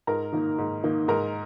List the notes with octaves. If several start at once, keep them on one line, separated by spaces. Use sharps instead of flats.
G#2 A#4 A#5
D#3 A#3 D#4
G#2
D#3 A#3 D#4
G#2 A#4 A#5